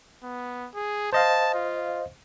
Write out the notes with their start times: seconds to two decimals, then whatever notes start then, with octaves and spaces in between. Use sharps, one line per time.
0.23 B3
0.74 G#4
1.13 C5 D#5 F5 A5
1.54 F4